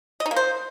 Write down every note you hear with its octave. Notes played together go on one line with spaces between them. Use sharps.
D#5
D#4
A#3
C5